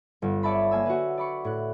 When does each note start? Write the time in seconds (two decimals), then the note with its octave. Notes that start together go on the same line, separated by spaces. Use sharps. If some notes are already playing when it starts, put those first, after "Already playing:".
0.22 G1
0.43 C#5 D5 E5 A5 B5
0.71 A#3 G#5 E6
0.86 F#4 B4
1.18 D5 B5 C#6
1.45 A2 F#6